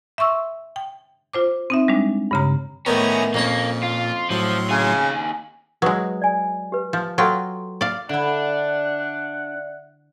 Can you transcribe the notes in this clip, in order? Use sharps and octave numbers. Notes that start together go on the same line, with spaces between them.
E5 C6 C#6 E6
G5
F4 C5 D6
C4 D#4 E5
G3 G#3 D4
G2 C#3 A#5
A2 D#3 B3 C#4 E4 A#5 D#6
F2 A#2 A#3 C#4 A5
F4
A2 F3 F#3 C6
D#2 C#3 G#5
F#3 G#3 B4 D#6
D5 G#5
G4 B4
F3
F#3 F4 A4 G5 C6 C#6
D5 F5
D3 D4 E4 D5 E5 F#5